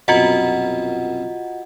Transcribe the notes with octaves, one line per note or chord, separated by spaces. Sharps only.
C2 F#2 B2 F4 F#4 D#5 F#5